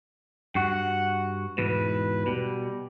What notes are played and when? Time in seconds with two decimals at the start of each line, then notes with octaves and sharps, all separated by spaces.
0.55 G2 F#4 F#5
1.58 E2 G#2 B2 B4
2.26 B2 G3